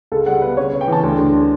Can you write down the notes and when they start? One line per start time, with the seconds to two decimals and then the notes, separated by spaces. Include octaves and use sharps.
0.12 C#2 A4
0.26 G3 F#5
0.42 B3 B4
0.57 C#3 C#5
0.73 C#3
0.81 G5
0.88 E3 A5
1.03 D2
1.18 D2